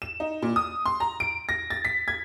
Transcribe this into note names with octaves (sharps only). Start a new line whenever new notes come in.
E7
D#4
A#2
D#6
C6
A#5
D7
A#6
A6
B6
G#6